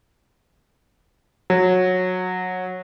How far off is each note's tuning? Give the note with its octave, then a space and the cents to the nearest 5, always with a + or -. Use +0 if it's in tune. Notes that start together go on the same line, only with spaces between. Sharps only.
F#3 -15